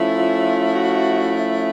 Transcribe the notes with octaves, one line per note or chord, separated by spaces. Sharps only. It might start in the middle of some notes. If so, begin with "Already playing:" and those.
Already playing: F3 A3 C#4 E4
F4
F4
F#4